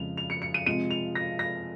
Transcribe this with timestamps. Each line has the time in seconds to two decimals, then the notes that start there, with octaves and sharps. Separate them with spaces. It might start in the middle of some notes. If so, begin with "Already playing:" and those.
Already playing: F2 C#3 G#3 F7
0.17 F7
0.30 C#7
0.42 C#7
0.54 D#7
0.66 C3 F3 G#3 D#7
0.91 F7
1.15 A#6
1.39 A#6